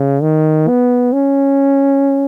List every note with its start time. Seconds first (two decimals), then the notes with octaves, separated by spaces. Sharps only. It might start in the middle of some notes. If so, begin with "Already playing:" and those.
Already playing: C#3
0.22 D#3
0.68 B3
1.13 C#4